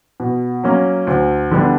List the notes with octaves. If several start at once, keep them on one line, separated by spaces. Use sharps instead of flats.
B2
F#3 A#3 C#4
D2
D3 G3 B3 D4